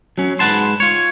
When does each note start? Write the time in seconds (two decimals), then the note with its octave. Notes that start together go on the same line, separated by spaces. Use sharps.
0.18 F#3 C#4
0.39 G#2 G#3 B4 F#5 A5 C6
0.80 F4 C#5